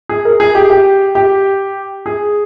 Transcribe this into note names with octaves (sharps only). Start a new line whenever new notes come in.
G#4
A#4
G#4
G4
G4
G4
G#4